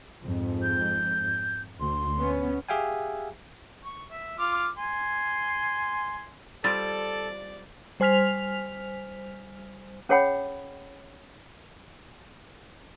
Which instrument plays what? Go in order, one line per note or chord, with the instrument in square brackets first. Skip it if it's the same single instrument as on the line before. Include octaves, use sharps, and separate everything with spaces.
[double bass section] F2 G#2
[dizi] G6
[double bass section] D2 [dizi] C6
[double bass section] B3 C#4
[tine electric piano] G4 G#4 E5 F5 G5 G#5
[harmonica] C#6
E5
F4 D6 F6
G#5 C6
[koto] G3 C4 F4 [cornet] A4 [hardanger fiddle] D5 [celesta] A6
[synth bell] G3 C5 G#5 F6 B6 F7
[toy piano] C#4 G#4 C#5 F#5 G5 B5